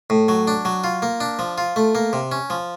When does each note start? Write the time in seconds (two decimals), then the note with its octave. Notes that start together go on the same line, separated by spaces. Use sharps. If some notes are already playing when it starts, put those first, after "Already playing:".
0.10 A2
0.28 F#3
0.47 D4
0.65 F#3
0.84 F4
1.02 A#3
1.20 D4
1.39 F3
1.58 F4
1.76 A3
1.95 A#3
2.13 C3
2.32 C#4
2.50 F3